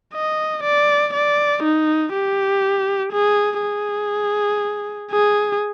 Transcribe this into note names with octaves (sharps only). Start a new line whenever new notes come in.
D#5
D5
D5
D#4
G4
G#4
G#4
G#4